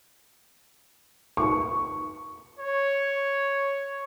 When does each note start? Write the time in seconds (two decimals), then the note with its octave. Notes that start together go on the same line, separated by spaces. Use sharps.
1.37 C#6
2.59 C#5